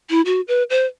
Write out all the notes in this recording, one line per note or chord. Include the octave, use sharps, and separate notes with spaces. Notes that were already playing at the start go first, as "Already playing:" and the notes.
E4
F#4
B4
C5